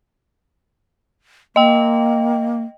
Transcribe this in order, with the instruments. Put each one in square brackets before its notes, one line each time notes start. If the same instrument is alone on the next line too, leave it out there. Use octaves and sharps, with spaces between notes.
[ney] A#3 [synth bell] D#5 G5